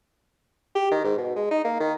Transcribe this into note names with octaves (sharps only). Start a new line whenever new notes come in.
G4
D#3
G#2
B2
G#3
D#4
A#3
D#3